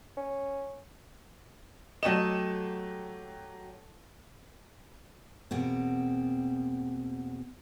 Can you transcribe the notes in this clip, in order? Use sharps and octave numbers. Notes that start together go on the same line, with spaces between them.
C#4
F#3 A3 G4 C#5 D#5 E7
E2 B2 A#3 C4